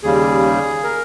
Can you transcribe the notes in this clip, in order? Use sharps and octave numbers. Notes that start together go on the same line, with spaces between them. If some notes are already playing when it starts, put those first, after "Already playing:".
D#2 C#3 G3 G#4
A#4